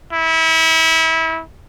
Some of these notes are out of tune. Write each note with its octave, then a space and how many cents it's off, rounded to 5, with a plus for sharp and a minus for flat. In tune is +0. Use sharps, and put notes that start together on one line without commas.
E4 -30